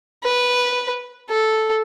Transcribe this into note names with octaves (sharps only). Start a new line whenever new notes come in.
B4
A4